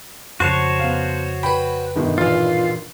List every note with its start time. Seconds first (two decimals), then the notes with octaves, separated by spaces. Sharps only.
0.40 F2 C#3 F#4 C5 C#5 A5
0.80 B3 F5
1.43 B4 G5 B5
1.96 G1 B2 D#3
2.18 E2 A#2 F4